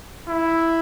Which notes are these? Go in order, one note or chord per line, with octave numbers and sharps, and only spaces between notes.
E4